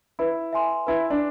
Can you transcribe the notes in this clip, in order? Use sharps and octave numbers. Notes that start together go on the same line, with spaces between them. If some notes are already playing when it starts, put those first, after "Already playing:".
E4 B4
E5 G#5 C6
E4 B4
D4